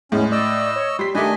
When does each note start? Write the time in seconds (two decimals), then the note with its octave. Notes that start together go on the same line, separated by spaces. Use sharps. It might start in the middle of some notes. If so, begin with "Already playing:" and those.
0.12 E2 A2 G#3 C#4
0.32 D5 D#5 E6
0.76 C#5
0.99 G3 C6 B6
1.15 D#3 G3 A3 D4 D#5 G#5